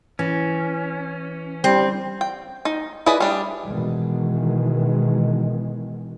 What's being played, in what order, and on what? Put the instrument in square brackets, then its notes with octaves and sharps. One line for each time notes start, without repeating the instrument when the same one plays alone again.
[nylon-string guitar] E3 [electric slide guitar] C#4
[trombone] G3 [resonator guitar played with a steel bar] C4
[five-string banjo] G5
D#4
E4 G#4 B4 D5 D#5
G3 D4
[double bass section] B2 D#3 E3 G#3